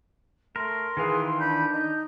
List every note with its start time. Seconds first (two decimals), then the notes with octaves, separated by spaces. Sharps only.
0.56 A3 A#4 C6
0.97 D#3 E3 G#4 B4 F5
1.39 D4 B5 G6
1.72 D#4